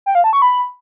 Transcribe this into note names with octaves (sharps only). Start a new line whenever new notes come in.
G5
F5
A5
C#6
B5